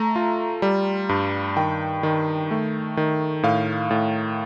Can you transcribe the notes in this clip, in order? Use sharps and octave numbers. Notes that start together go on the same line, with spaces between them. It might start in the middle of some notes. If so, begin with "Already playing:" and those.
Already playing: A3 A#5
F4
G3
G2
D#3 G5
D#3
A3
D#3
A2 F5
A2